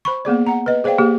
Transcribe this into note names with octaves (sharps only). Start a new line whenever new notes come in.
C5 B5 C#6
A#3 B3 G#4 D5
F#5 A#5
B4 D#5
G#4 C5 D5 F5 G5
A#3 G4 G#4